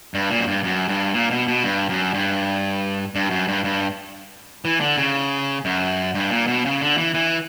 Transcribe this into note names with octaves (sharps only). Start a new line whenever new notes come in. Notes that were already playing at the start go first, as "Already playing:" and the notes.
G2
A#2
F#2
G2
F#2
G2
A#2
B2
B2
G2
F#2
G2
G2
F#2
G2
G2
E3
D3
C#3
F#2
G2
A#2
B2
C#3
D3
E3
E3